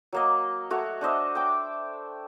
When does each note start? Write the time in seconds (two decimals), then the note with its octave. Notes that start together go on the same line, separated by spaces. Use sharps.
0.13 F#3 A#3 D#5
0.70 A3 F#4 C#5
1.01 D4 C5 D#5 E5
1.35 G5 D6